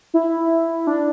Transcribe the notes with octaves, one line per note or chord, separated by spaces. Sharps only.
E4
D4